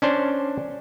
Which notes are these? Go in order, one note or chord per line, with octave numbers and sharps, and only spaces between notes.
C#4 D4 C5